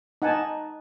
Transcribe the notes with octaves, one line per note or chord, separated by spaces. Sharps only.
D#4 F#5 G#5 A5